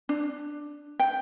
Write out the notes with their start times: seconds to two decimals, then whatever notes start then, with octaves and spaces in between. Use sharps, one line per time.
0.09 D4
1.00 G5